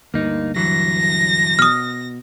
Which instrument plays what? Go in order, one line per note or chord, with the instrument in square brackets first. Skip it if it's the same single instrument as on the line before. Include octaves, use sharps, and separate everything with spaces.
[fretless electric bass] D2 G2 [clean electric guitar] A#3 D#4
[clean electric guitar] E3 F#3 [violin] A#6
[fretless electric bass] B2 [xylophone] D#6 F6